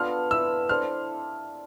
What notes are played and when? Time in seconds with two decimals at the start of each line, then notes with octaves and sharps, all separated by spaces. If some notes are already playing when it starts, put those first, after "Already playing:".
Already playing: B3 D4 F4 A4 F6
0.31 E4 B4 E5 E6
0.69 D4 A4 C5 F6